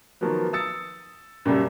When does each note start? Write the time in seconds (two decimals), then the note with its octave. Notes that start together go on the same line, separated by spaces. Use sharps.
0.21 D#3 F3 F#3 A#3 B3
0.53 D#6 E6 A6 C#7
1.45 F#2 A#2 C#3 G3 A4